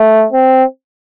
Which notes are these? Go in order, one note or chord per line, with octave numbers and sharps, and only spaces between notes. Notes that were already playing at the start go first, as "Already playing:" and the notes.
Already playing: A3
C4